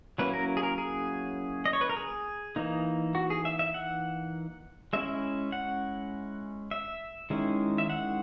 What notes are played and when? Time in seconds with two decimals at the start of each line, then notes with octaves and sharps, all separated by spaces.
0.18 F#3 A#3 C#4 E4 B4
0.34 A#4
0.57 G#4
0.63 A#4
0.78 G#4
1.66 D#5
1.73 C#5
1.81 B4
1.89 A#4
1.97 G#4
2.56 E3 A#3 D#4
3.15 F#4
3.30 G#4
3.45 E5
3.59 E5
3.74 F#5
4.93 G#3 C#4 E4 E5
5.52 F#5
6.71 E5
7.30 D#3 G#3 C#4 E4
7.78 E5
7.90 F#5